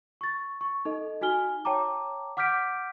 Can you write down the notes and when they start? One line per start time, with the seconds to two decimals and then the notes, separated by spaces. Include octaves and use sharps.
0.21 C#6 A6
0.61 C#6
0.85 D#4 A4 D#5
1.21 D#4 F#4 G#5 F6 G7
1.65 C#5 G5 A5 A#5 D6
2.37 F#5 D6 F6 G6 B6 D7